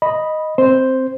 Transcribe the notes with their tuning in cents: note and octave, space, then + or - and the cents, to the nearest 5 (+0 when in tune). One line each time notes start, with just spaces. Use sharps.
D#5 +0 B5 -10
C4 +0 C5 +0